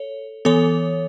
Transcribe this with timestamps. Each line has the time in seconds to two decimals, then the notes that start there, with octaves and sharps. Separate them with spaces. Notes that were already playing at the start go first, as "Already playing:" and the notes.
Already playing: A4 C#5
0.45 E3 B3 A4 C#5